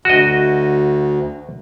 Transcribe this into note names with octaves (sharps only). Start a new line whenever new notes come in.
D2 F#4 D#5